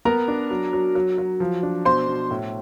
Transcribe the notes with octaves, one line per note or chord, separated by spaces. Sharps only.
B3 A#4 A#5
D4
F#3
F#3
F#3
F#3
F3
D4
B2 C5 C6
B2
A2